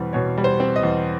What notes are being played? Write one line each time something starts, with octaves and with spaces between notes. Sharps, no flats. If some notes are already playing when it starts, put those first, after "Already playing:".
Already playing: E2 B2 G3 C4
B2 C#5
G3
C5
C4
D#5
E2